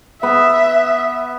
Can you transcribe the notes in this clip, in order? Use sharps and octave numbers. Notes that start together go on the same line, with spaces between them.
B3 E5